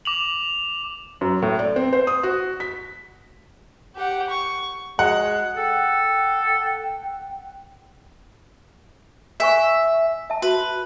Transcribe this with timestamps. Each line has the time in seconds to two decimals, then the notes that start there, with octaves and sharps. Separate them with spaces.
0.05 D6 F7 F#7
1.21 F#2
1.42 A2
1.59 D5
1.76 C4
1.93 C5
2.07 D#6
2.23 F#4
2.60 B6
3.96 G4 F#5
4.30 C#6
4.99 G#3 F#4 F#5
5.57 A4 G5
9.40 C5 E5 G#5 C#6
10.30 E5 A5
10.42 F#4 B4